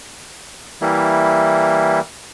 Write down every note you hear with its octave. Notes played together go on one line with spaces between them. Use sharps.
E3 G3 A#3 E4